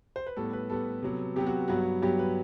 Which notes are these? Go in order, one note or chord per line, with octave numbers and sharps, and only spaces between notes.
C5
B4
A2 G3 B3 A4
B4
A2 G3 B3 A4
C3 F#3 B3
C3 F#3 B3 G4
F#4
G2 F#3 B3 F#4
G2 F#3 B3 G4
B4